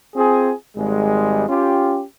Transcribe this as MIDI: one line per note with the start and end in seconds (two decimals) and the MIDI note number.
0.15 0.53 60
0.15 0.53 65
0.15 0.53 68
0.77 1.44 32
0.77 1.44 55
0.77 1.44 56
1.49 2.02 61
1.49 2.02 65
1.49 2.02 67